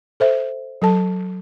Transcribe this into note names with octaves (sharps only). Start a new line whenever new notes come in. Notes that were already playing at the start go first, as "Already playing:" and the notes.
A4 C5 E5
F#3 A4 A5